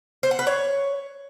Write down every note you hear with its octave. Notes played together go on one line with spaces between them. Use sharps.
C5
F#5
B4
C#5